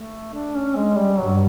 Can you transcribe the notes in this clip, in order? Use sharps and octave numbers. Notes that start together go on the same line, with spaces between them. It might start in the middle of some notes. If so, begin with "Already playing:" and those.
Already playing: A3
D4
C#4
G#3
G3
G2 F#3